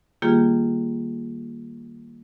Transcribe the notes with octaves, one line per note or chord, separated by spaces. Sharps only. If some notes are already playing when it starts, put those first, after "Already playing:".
D#3 G3 A#3 F4 G4 G#4